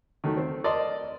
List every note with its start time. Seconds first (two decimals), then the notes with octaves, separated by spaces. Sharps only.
0.24 D#3 F#3 A3
0.37 C4
0.64 A#4 D5 D#5 A5 C6